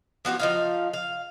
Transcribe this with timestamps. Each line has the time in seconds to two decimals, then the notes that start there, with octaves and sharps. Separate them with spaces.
0.25 F3 B3 F#4 G4
0.39 F3 D#4 F5
0.93 F5